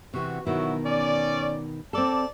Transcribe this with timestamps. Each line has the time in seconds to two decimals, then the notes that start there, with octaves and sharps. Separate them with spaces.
0.14 C3 E3 F#4
0.47 B2 D#3 F#3 E4 F#4
0.85 C#4 D5
1.93 C4 A4 D5 A5